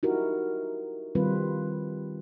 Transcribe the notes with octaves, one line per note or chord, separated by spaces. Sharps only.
D#4 E4 F#4 G4 A#4
D#3 G3 C4 F4 B4